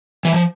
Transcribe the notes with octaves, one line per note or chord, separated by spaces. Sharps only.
E3
F3